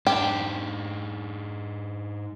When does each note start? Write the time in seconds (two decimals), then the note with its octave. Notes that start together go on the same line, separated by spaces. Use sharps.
0.07 G#2 D4 G4